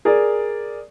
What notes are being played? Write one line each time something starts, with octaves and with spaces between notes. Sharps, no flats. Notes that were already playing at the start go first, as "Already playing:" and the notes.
G#4 A#4 D5